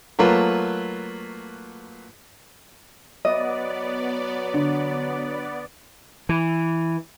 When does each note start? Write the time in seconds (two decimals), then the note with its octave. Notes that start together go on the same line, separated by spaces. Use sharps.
0.19 F#3 A3 A#3 F4 B4
3.25 F#3 B3 D5 D#5
4.54 D3
6.29 E3